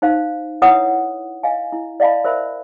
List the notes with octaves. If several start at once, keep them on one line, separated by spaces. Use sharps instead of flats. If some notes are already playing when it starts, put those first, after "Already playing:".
D#4 C5 F5
E4 B4 C#5 E5 F#5 D#6
D#5 F5 G#5
E4
D5 D#5 F5 A5 B5
A#4 C5 E5 B5